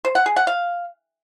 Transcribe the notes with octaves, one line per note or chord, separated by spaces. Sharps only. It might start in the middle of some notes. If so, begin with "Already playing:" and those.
C5
F#5
G#4
F#5
F5